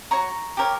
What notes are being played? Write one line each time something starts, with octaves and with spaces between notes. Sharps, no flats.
F#4 C#5 A#5 C#6
G4 A#4 C#5